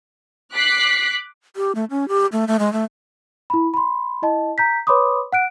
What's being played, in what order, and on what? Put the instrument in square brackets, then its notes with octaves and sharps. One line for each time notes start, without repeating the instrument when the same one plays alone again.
[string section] D6 F#6 B6 C7
[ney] G4
A3
C#4
G4
A3
A3
G#3
A3
[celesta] E4 B5
B5 C6
E4 D#5 A5
A#5 G6 B6
B4 C#5 B5 C6 D6 D#6
F#5 F#6 D7